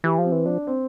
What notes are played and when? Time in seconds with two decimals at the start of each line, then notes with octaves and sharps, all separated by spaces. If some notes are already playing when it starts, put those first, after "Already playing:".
0.04 E3 G4
0.18 F3
0.24 C4
0.32 E3
0.45 F3 D4
0.67 C4